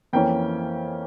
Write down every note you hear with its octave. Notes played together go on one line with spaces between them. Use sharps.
F2 E3 A#3 C#4 G5